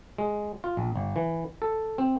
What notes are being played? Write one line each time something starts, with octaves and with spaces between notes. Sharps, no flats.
G#3
F4
A#1
G1
E3
A4
C4